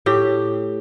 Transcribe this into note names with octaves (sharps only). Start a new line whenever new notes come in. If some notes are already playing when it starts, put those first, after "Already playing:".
A2 G4